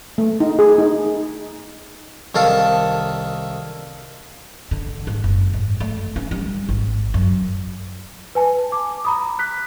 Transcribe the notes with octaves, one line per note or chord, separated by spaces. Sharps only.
A3
D#4
G#4
D#4
C2 D#3 A4 F5 A5
D3
G#2
F#1
G#2
A3
C#4
G3
G#1
F#2
B4 G#5 A5
D6
A#5 B5 D#6
F#6 B6